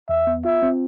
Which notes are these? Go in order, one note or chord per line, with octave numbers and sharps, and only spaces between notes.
E2 E5
B3
F4 E5
C4